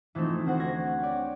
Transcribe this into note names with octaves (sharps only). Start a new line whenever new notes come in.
E3 F3 A3 C4 D#4
D2 C4 F#4 C5 F#5
G#6 A#6
G4 C#5 D5